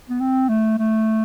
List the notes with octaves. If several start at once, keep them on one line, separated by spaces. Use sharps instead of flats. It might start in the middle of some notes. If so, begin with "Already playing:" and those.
B3
C4
A3
A3